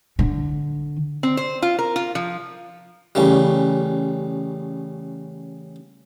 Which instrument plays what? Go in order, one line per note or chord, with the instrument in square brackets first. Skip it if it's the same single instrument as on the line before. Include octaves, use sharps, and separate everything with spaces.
[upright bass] D3
[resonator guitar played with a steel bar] C4
C5
F4
A#4
F4
F3
[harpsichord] A1 C#3 G3